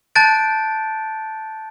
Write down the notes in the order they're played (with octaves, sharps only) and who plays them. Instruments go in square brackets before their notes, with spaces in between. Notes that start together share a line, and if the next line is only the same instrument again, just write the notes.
[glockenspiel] A5 F#6 G6 A6 D7